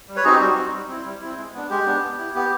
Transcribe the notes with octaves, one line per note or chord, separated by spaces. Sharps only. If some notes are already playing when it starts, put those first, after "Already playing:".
G3
B4 C#5
C4 D#4 F#4 G#4
G4
G3 F#4
C4 D#4 F#4
G3
C4 E4
G3
C4 E4
G#3
B3 D4
G#3 G4
B3 D4
B3
E4
B3 G4